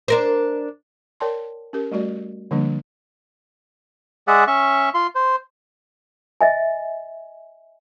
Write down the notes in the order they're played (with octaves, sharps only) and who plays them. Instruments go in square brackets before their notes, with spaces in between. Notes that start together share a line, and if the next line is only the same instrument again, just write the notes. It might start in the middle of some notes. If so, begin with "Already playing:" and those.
[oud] D4 A#4 C5
[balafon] A#4 C#5 D5 G5 A5 C6
C#4 G4 A#4
G3 A3 F#4 D5
D3 F3 G3 A#3 D4
[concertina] G#3 G#4 D5 E5 F#5
C#4 E5 C#6
F4 C6
C5
[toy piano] D#5 E5 G#5